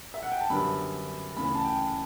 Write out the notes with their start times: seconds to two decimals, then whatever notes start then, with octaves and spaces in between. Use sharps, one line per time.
0.14 E5
0.23 F#5
0.32 G5
0.41 A5
0.50 F#2 D3 G3 B3 B5
1.36 D2 C#3 E3 B5
1.55 A5
1.65 G5